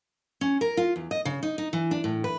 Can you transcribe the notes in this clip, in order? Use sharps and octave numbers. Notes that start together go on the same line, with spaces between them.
C#4
A#4
F4
E2
D#5
C#3
D#4
D#4
E3
D4
A2
B4